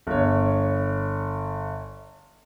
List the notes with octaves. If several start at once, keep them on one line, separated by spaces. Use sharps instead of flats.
G1 C#5